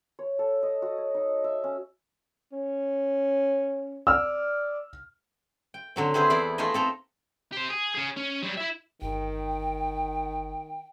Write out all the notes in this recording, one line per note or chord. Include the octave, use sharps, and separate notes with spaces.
C#5
A4
D#5
F#4
C#5
D#4
E5
C#4
C#4
D5 E6 F6
G5
D3 F#3 C4
C4 E4 G#4 B4 C5
E2 E4 D5 B5
A3 D#4 F4 G#4 D#5 E5
C4 A4 A#5
G4 C5
G#4
C#4 G#4
C#4
F#3 G3
E4 E5
G1 D#3 G5